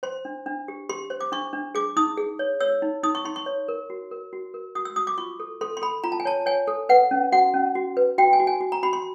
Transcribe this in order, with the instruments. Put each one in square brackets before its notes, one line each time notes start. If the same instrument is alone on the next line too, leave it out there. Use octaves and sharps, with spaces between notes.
[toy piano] C5 C6
D4
D4
G4
G4 C6
C5
D6
D4 C#6
D4
G#4 D6
D#4 D#6
G#4
C#5
C#5 E6
D#4
D#4 D#6
C#6
D#4 C6
C#6
C#5
A#4
F#4
A#4
F#4
A#4
F#4 D#6
E6
F#4 D#6
D6
F4 C#6
A4
A4 C6
C6
A4 B5
F4 A#5
A5
G#5
C#5 A5
C#5 G#5
A4
B4 F#5
C#4
F#4 F#5
C#4
F#4
B4
F#4 G5
G#5
F#4
G#5
F#4
A#5
F#4 B5
C6